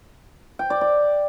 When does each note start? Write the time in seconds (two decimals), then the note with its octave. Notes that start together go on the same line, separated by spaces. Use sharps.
0.59 G5
0.70 D5
0.81 D5